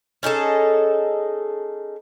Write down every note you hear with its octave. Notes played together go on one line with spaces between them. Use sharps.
C#4 D#4 G#4 A4